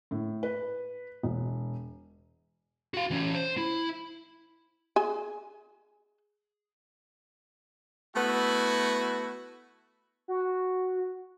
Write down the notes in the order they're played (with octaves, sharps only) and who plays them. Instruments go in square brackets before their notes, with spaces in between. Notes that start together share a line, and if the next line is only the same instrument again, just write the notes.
[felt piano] A2
B4
E1
[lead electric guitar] F#4 F5
E3 C#4
C5
E4
[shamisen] G#4 G#5
[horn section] A3 B3 E4 F#4
[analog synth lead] F#4